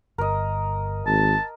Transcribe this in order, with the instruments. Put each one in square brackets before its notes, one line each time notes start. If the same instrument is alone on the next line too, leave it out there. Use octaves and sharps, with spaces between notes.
[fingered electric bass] G1 [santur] A#4 D#5
[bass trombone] G#1 [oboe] A5